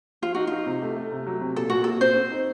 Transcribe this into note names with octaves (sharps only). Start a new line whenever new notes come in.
F3 F4
D#4 F#4
D#4 F4
C3
A3
A3
C3
F#3
C3
A#2 A4
A#2 F#4
A#2 A4
C4 C5
C4
D#4